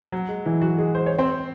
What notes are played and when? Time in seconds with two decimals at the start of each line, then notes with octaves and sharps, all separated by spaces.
0.12 F#3
0.29 G#3
0.45 E3 E4
0.62 F#3 F#4
0.78 G#3 G#4
0.95 C5
1.06 C#5
1.18 C4 C5